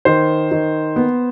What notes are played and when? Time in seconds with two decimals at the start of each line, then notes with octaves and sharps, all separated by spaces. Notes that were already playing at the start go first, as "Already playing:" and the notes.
0.05 D#3 C5
0.51 D#3
0.96 B3